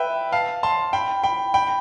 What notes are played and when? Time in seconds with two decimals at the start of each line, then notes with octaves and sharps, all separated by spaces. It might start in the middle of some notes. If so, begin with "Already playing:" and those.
Already playing: B4 E5 G5
0.32 F5 A5
0.63 A5 C6
0.93 G5 B5
1.23 G5 B5
1.54 G5 B5